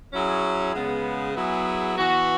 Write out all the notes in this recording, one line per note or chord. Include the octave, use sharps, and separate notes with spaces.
F#3 C#4 E4 G#4
C#3 G#3 B3
F#3 B3 E4 G#4
E3 B3 F#4